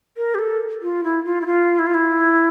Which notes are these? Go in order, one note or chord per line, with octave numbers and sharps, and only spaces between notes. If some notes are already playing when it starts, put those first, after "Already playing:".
A#4
G4
A4
F4
E4
F4
E4
F4
E4
F4
E4